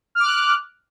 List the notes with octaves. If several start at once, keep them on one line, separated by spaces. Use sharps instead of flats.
D6 F6 F#6